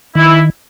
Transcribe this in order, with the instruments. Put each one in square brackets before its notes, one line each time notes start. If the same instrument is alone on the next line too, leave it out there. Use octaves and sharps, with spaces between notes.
[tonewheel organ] D#3 [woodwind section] E4